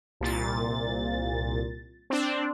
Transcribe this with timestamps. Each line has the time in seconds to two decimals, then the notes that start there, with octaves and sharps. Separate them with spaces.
0.21 C2 A#2 A6
2.10 C4 D4